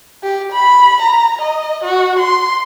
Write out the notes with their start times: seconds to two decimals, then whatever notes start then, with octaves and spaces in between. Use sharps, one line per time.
0.23 G4
0.52 B5
1.02 A#5
1.41 D#5
1.84 F#4
2.19 C6